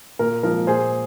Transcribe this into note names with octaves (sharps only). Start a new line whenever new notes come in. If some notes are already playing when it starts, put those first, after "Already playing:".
A#2 A#4
F3 G#3 A#4
A#2 G#4 C5